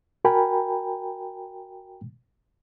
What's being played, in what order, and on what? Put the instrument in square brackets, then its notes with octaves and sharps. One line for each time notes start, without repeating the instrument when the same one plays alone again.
[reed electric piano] F#4 A#4 G5 G#5 A#5 B5